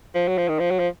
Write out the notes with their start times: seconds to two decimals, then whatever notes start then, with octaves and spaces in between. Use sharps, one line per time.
0.15 F3
0.28 F#3
0.38 F3
0.49 D#3
0.60 F3
0.71 F#3
0.79 F3